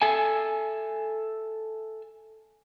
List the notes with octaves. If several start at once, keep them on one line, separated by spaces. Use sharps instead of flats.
A4 E5 G#5